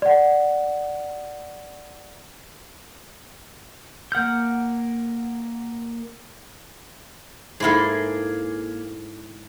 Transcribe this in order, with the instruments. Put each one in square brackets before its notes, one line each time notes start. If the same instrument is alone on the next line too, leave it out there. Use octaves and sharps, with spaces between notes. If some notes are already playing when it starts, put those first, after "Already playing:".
[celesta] D5 F#5
[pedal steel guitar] A#3 F#5 F6 G6
[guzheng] G#2 E4 A4 [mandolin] A#3 G#4